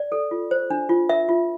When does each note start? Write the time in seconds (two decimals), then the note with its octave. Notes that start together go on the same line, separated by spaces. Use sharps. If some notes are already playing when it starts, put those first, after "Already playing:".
Already playing: D5
0.12 A4
0.31 F4
0.51 C5
0.70 D4
0.89 F4
1.09 A#4 E5
1.29 F4